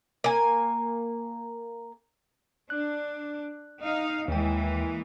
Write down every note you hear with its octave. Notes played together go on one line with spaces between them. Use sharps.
A#3 G#5
D4 F#6
D#4 F5
D#2 E3 G#3 A#3 G5